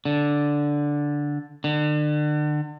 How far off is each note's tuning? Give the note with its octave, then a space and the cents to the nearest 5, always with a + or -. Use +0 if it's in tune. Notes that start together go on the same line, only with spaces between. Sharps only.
D3 -5
D3 +35